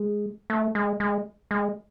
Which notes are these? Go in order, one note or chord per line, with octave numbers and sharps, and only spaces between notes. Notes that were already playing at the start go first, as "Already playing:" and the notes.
Already playing: G#3
A3
G#3
G#3
G#3